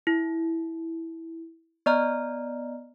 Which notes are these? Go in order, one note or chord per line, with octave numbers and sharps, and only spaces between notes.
E4
B3 D5 D#5 A#5 F6